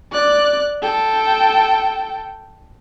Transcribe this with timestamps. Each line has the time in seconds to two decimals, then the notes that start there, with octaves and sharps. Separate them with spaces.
0.11 D5 F#6
0.82 A4 G5